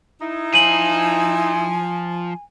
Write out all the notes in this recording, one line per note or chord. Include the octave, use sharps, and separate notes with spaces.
D#4 E4
F3 C5 G#5 D#7 F#7